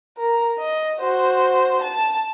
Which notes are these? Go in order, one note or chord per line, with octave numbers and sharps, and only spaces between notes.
A#4
D#5
F#4 C5
A5